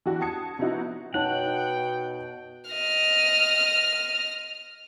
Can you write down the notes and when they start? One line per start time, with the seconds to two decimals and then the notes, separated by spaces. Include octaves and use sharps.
0.06 E3 D4 F#4 G4
0.21 A5 D#6 G#6 C#7
0.59 C3 F3 B3 D#4 E4 F#4
1.14 B2 D#4 C#5 F#5 G5 A5
2.71 D#5 F6